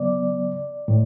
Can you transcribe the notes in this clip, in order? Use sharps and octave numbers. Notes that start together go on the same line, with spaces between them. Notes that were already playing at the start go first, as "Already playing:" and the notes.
Already playing: C#3 F#3 B3 D5
A2